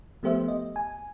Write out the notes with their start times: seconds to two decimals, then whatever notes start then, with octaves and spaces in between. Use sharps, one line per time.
0.23 F3 A3 B3 G4 C5 E5
0.48 D#5
0.76 G#5